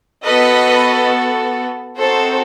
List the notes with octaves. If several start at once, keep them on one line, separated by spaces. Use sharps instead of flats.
B3 F#4 A4 B4 D#5
C4 D#4 F#4 A4 C5